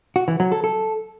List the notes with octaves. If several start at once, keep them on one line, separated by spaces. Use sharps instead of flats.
F#4
E3
F#3
A4
A4